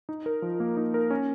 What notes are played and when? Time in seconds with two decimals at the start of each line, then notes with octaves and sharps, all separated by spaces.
0.09 D#4
0.26 A#4
0.42 F3
0.60 A#3
0.77 D#4
0.94 A#4
1.10 C#4